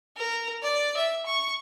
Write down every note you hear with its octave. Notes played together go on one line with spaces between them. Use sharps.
A#4
D5
E5
C#6